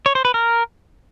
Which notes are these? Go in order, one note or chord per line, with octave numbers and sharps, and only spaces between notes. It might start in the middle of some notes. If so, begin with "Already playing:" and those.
C#5
C5
B4
A#4